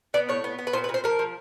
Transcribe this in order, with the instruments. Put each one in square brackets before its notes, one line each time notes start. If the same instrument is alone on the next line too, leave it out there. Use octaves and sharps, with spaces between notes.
[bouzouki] B3 D5
A2 C#5
B3
B3
B4
A#2 C5
B4
A#2
C5
F3 A#4
F3